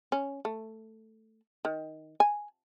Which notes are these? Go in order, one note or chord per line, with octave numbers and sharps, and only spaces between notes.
C#4
A3
D#3
G#5